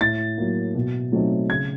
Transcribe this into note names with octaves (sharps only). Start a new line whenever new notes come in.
A2 A6
F#3 A#3
B2
F#3 A3 C4 D#4
C#3 G#6